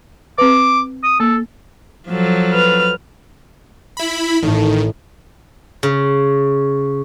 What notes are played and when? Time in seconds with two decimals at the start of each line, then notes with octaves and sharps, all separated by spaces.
0.38 C4 B4 D6
1.03 D#6
1.20 A#3 A4
2.08 F3 F#3 A4
2.54 B4 F6
3.97 E4 B5
4.43 A1 A2 D#3
5.83 C#3